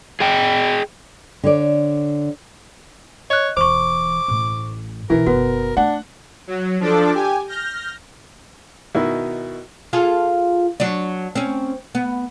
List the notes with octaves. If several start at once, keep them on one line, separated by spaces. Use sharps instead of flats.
G#4 D#5 G5
D3 C#5 D5
C#5 D#5 F#6
E1 E3 C5 C#6 D6
A1 A2
B2 D#3 E3 A#4
F#1 B2 B3 F#4
A3 D4 F#5
F#3
F3 D4 A4 D6
G4 G#5
F6 G6 A#6
B2 D#3 E4
F4 G#4 A4
F#3 D4
C4 C#4
B3